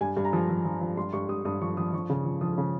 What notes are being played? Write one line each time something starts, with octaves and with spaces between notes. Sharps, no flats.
G2 G#5
G2
A#5
F3
F3
F3
F3
G2 C6
G2 C#6
G2 D#6
G2 D#6
F3 C#6
F3 D#6
F3 C#6
C#3
F3
F3 D#6
C#3